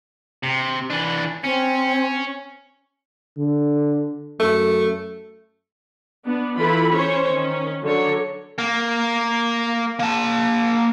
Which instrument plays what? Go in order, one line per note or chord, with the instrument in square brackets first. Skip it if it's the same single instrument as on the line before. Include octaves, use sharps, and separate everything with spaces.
[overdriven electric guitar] C3
E3 D4
[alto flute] C4 [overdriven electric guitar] C#4
[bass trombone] D3
[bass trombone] F#2 [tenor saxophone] A3
[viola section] B3 D4
E3 E4 F4 A4 B5
C#4 C5 C#5
D#3 C#4
D3 F#3 A4 C#5
[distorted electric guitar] A#3
A#3 A5